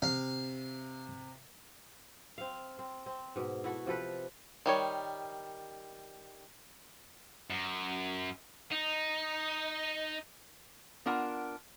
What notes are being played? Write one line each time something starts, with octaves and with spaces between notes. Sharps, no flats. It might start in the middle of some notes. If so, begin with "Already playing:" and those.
C3 F5
C4 F5
C4
C4
G#2 B2
E4 F#4 A4
C3 F3 A4 B4
D#3 G3 C#5
F#2
D#4
B3 D4 F4 A#4 F#5